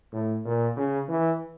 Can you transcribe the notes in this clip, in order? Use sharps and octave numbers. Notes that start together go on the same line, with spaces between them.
A2
A#2
C#3
E3